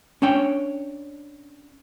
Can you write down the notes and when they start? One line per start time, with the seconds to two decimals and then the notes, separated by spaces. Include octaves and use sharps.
0.22 C#4 D4 C#5 G5